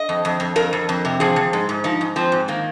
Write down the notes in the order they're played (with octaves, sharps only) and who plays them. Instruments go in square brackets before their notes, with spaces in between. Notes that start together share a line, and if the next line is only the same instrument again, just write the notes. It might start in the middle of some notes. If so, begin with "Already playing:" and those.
Already playing: [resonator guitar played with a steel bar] D#5
F2
F2
F2
F2 A#4
F2
F2
C3
F3 G#4
F3
G#2
G#2
F3 D#4
G#2
F3 C4
G#2
D#3 A#3